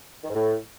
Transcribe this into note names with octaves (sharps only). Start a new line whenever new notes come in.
D#3
G#2
A2